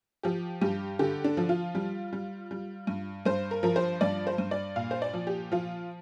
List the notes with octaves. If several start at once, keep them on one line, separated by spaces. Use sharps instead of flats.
F3 G4
G2 G4
D3 G4
D4
F3
F4
G3
G3
G3
G2
G2 C5
A#4
F3 A#4
C5
G2 D5
C5
G2
D5
A#2 F5
C5
D5
F3
G4
F3 F4